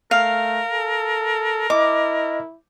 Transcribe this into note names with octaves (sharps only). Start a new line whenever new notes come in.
A3 A#4 F5
A4
E4 D#5 D6